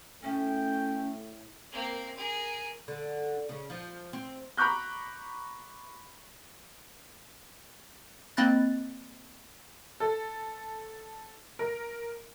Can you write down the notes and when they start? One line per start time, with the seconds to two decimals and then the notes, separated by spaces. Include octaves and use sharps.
0.23 A2 A3 C#4 G5
1.72 A#3 C4
2.17 G#4 A#4
2.88 D3
3.49 C#3
3.70 F3
4.13 C4
4.57 A#5 B5 C#6 D6 F#6 G6
8.37 A#3 C4 D#5 B5 F#6 A6
10.00 A4
11.59 A#4